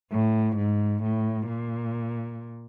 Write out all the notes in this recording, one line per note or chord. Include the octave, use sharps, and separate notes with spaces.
A2
G#2
A2
A#2